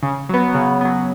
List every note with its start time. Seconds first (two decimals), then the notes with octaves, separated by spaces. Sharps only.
0.03 C#3
0.29 F#3 B3
0.55 C#3
0.81 F#3 B3